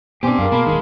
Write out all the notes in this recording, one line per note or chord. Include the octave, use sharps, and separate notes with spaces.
B2 B3 C4 D4 G4 G#5 C6 D6
F#2 G#4 A#4 F5
B2 A#3 A5 B5 C6
D#1 D#2 D#3 G#3